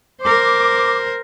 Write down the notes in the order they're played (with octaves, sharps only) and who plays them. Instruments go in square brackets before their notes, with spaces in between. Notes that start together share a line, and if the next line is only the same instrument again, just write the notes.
[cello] A#4 C5 [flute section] D6